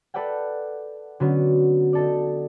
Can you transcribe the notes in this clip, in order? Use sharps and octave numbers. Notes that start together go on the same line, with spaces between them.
A4 B4 D5 E5 F#5 G5
D3 F#3 B3 C#4
D#4 A4 D5